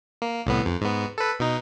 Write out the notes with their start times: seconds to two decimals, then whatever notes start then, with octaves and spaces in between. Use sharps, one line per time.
0.22 A#3
0.46 C2 A2 B3
0.66 F2
0.81 G#2 B3
1.18 A4 B4
1.40 B2 D#4